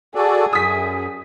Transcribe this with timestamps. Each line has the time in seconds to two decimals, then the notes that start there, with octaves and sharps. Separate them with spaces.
0.15 F#4 G#4 A4 D5
0.53 F#2 D#6 B6